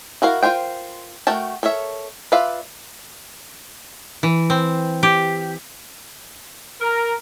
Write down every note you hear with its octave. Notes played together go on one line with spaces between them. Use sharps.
E4 F#4 A#4 F5
F4 A#4 C5 G5
A3 F#4 A#4 G5 A5
A4 A#4 C#5 E5
F4 B4 D5 E5 F5
E3
C4
G4
A#4